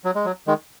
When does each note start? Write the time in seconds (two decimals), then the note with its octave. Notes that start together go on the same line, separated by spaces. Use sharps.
0.05 F#3
0.15 G#3
0.25 F#3
0.47 D#3 G#3